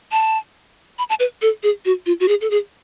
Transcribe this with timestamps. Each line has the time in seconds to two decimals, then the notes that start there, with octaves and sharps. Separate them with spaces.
0.12 A5
0.98 B5
1.09 A5
1.20 B4
1.42 A4
1.63 G#4
1.85 F#4
2.06 F4
2.20 F#4
2.28 G#4
2.41 A4
2.51 G#4